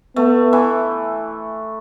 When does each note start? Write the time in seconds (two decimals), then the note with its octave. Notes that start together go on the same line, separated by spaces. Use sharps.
0.16 A3 B3
0.53 E3